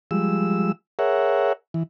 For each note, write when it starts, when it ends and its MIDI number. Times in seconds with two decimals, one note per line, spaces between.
0.11 0.72 53
0.11 0.72 55
0.11 0.72 56
0.11 0.72 88
0.99 1.53 68
0.99 1.53 70
0.99 1.53 73
0.99 1.53 76
0.99 1.53 78
1.74 1.83 52